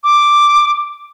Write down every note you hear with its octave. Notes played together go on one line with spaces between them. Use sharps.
D6